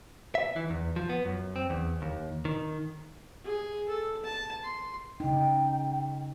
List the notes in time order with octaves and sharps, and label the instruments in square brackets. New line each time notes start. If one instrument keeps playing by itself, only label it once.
[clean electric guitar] E5
E3
E2
F3
B3
F#2
C4
E2
D#2
D#3
[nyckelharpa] G#4
A4
A5
C6
[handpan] C#3 D#4 [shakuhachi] G5